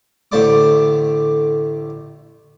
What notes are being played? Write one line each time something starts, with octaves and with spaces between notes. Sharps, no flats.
A1 D3 A3 C5 D5 D6